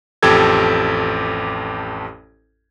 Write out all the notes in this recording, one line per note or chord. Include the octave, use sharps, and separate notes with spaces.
A1 F2 G4 A4 G#6